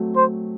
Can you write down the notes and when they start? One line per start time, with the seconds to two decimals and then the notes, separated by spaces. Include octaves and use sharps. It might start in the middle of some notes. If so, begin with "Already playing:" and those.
Already playing: F#3 A3 C4
0.16 C5